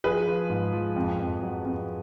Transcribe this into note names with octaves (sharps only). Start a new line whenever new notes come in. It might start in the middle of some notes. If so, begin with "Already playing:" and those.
F3 G#4 B4
F3
G#2
F3
F2
F2
F#3
F2